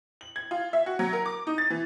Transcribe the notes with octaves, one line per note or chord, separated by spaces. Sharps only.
F#7
G#6
F4
E5
F#4
F#3
A#4
D6
D#4
A6
E3